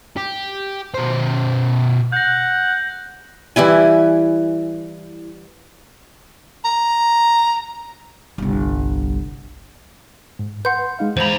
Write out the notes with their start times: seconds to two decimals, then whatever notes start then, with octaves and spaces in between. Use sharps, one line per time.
0.17 G4
0.94 B2 C5
2.12 F#5 G6 A#6
3.56 E3 G3 E4 G#5
6.65 A#5
8.38 G1 C2
10.39 G#2
10.65 B4 F#5 C6 G6
10.99 G#3 D#4 F5
11.17 E2 C5 A#5 B5